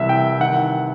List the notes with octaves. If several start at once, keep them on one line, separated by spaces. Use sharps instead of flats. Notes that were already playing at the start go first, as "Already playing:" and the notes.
Already playing: C2 E3 E5
G5
D#3 F#5